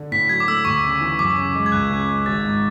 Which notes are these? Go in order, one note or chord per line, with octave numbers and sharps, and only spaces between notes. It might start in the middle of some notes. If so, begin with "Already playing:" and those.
Already playing: D3
A2 B6
F#3 G#6
D6
A3 E6
D2 C#6
C#3
E3
F#2 D6
C#3
G#3
G#6
C#2 F#6
C#3
G#3
G#1 A6
G#2